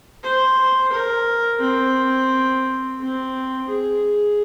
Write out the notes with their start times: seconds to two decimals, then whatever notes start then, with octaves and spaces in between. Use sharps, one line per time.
0.23 C5
0.93 A#4
1.61 C4
3.00 C4
3.68 G#4